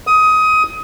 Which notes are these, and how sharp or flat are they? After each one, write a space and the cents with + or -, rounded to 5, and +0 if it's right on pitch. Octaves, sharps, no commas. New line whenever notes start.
D#6 +20